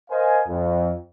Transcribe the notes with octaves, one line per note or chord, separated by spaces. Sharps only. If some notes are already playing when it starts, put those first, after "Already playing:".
A#4 C5 D#5 F5 G#5
F2